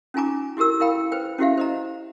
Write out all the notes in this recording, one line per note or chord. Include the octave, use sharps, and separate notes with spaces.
C#4 D#4 F4 G#5 A#5 D6
E4 F#4 G4 A#4 E6
E4 A#4 F5 G5 B5
B4 C5 G5
C#4 E4 F#4 G4 E5 F5
C5 D#5 A#5